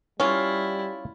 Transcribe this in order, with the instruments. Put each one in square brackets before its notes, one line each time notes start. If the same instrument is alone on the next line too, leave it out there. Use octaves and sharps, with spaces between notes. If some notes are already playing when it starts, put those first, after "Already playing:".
[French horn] G3 [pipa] C#4 F4 [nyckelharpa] E4 [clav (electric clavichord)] C#5